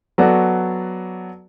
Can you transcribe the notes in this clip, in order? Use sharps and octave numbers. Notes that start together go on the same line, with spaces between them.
F#3 B3 F#4 A4 D5